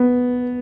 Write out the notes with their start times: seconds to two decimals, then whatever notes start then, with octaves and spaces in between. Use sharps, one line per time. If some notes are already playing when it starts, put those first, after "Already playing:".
Already playing: B3